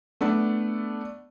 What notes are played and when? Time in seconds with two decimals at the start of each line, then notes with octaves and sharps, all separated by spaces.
0.21 A3 B3 D4